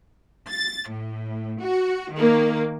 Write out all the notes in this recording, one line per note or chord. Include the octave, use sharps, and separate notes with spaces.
A6
A2
F#4
D#3 A#3